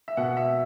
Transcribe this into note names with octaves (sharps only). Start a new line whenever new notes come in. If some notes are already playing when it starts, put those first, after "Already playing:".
E5
B2 F#5
E5